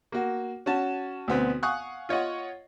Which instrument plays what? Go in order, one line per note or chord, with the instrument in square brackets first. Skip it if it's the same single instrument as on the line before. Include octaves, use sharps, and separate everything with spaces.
[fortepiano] A#3 F#4
C#4 F#4 A5
D2 B2 B3 C4
F5 F#5 G#5 C#6 D#6 F#6
F4 C#5 D#5 F#5